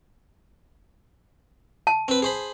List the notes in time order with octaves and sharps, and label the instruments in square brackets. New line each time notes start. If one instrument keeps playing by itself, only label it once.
[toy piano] A5
[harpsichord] C4 B4
G#4 C5 B5